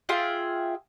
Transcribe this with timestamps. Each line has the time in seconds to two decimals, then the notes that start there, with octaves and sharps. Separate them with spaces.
0.09 F4 G#4 E5 G5